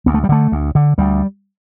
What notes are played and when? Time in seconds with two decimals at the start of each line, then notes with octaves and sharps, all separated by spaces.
0.06 D2 B3
0.14 A3
0.24 G3
0.29 D3 A3
0.52 D2
0.75 D3
0.98 D2 G3